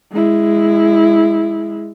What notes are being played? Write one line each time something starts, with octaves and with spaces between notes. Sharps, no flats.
G#3 E4